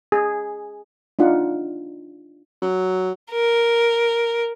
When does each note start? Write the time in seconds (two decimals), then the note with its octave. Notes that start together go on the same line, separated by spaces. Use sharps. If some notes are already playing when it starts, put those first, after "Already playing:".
0.12 G#4
1.19 D4 D#4 F4 F#5
2.62 F#3
3.32 A#4